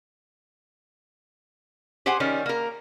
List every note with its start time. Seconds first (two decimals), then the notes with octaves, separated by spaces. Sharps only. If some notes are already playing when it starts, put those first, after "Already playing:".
2.06 G4 G#4 C5 F#5 G#5
2.20 D#3 G3 C#4
2.46 A#3 A#4